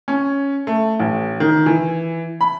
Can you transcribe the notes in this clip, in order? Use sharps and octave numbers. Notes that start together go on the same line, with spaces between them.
C#4
A3
A1
D#3
E3
B5